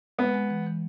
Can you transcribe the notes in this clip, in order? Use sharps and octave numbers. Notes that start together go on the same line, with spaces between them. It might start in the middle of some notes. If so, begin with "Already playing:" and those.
G#3 B3
G#3
E3
E3